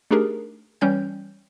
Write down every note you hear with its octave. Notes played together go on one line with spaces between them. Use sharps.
A3 D4 D#4 G4 G#4 A#4
E3 G3 C#4 C#5 G5 G6